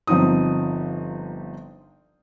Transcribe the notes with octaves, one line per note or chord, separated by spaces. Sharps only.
G1 F3 C4 D#4 D#6